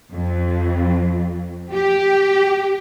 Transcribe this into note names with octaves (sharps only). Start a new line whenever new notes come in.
F2
G4